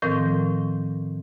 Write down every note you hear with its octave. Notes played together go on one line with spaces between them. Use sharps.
A2 D#3 F3 C4 A#4 G6